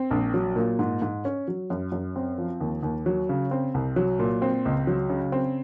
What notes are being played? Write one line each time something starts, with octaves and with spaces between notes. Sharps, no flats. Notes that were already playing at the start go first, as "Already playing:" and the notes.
Already playing: C4
A#1
F#3
A#2
G#2
G#2
C#4
F#3
F#2
F#2
C4
F3
D#2
D#2
F#3
C#3
C4
C2
F#3
A#2
C4
C#2
F#3
C#3
C4